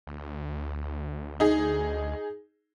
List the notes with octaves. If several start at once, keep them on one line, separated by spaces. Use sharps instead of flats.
D2
D#4 G#4